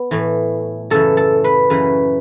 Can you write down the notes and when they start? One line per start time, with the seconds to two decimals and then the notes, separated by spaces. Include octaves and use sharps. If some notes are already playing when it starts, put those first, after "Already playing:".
Already playing: B3
0.11 A2 E3
0.90 F#2 C#3 E3 A4
1.17 A4
1.44 B4
1.70 F#2 C#3 E3 B4